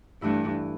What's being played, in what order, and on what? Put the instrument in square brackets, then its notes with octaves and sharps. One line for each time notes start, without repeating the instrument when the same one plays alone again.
[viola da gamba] G2 [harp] E3 A3 E4